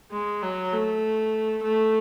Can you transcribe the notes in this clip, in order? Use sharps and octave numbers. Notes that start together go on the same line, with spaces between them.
G#3
F#3
A3
A3